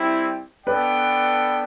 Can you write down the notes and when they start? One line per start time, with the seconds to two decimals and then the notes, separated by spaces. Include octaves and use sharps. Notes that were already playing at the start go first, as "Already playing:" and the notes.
Already playing: G3 C4 E4
0.67 B3 D4 A4 B4 D5 G5